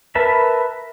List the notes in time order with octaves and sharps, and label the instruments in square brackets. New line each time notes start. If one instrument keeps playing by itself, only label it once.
[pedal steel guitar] A#4 B4 E5 A5 B5